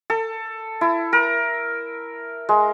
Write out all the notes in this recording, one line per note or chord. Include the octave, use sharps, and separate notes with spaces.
A4
E4
A#4
G#3